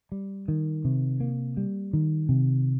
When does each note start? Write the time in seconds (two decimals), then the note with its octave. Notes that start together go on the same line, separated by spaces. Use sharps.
0.12 G3
0.48 D#3
0.85 C3
1.20 A#3
1.57 G3
1.93 D#3
2.29 C3